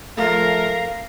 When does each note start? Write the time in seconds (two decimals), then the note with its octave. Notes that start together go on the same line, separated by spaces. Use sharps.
0.17 F3 A3 A#4 F5